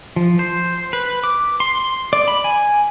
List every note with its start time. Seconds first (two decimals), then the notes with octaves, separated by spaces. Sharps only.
0.16 F3
0.39 C5
0.93 B4
1.24 D6
1.60 C6
2.13 D5
2.28 B5
2.44 G#5